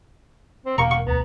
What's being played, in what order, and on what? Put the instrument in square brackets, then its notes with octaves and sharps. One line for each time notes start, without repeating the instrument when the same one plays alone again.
[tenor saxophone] C4
[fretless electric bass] E1 [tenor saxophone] A#3 [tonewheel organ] G5 [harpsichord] A#5 C#6
[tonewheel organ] F#5 [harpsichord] C#6
[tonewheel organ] D2 A#5 [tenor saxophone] B3